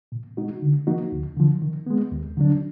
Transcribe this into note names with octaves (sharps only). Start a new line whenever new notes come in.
A#2
G#3 D#4 F#4
D3
F3 A#3 D#4 F#4
D2
D3 F3
D#3
G#3 B3
D#2
D3 F#3 D4